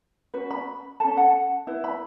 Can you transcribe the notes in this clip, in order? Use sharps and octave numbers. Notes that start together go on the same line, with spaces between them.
C#4 F#4 B4
B5
C#4 A4 A5
F#5
E4 B4
B5